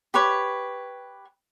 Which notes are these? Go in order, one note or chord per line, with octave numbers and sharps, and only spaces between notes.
G4 B4 C#5